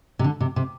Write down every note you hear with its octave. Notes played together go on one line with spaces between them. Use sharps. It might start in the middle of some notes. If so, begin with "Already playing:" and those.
C3
D3
C3
C3